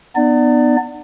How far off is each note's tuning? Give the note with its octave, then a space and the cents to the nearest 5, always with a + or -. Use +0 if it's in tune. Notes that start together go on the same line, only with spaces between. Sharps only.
B3 +0 D#4 -45 D5 +5